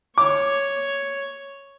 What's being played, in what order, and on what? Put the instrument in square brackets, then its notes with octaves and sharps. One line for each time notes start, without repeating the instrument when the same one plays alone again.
[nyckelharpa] C#5 [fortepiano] D6